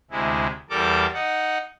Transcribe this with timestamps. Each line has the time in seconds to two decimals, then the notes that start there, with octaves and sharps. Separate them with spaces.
0.11 D2 C3 G#3 E4
0.70 E2 G3 A4 A#4 D6
1.14 D#4 F#5